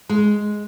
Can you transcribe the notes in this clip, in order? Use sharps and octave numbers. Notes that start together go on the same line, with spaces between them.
G#3